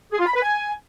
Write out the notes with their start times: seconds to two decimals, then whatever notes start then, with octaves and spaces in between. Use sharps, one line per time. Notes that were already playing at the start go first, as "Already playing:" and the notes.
0.11 G#4
0.19 F4
0.27 B5
0.34 B4
0.42 G#5